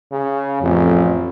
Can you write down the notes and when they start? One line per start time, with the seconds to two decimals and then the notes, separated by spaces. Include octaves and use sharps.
0.12 C#3
0.62 A1 F2